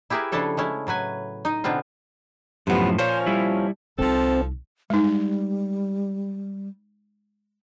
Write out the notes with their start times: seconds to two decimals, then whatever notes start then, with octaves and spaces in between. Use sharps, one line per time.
0.10 E4 G4 G#4 A#4 B4 E5
0.32 C#3 F3 D4 E4 A4 C#5
0.57 G#3 A3 C#4 E4
0.87 A2 F#3 B4 G#5
1.45 D#4 D#5
1.64 B2 D3 B3 C4 F4
2.67 F#2 A2 C3 F3 B3
2.98 A#2 F3 C#4 C5
3.26 G3 E4
3.99 C2 F3 C4 D#4 A4
4.90 G3 G#3 D#4